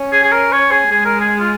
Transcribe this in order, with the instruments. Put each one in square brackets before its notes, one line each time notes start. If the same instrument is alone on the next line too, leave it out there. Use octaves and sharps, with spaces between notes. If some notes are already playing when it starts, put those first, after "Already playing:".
Already playing: [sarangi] C#4
[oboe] G#4
G#4
A#4
C#5
G#4
[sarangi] G#3 [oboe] G#4
[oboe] A#4
G#4
F4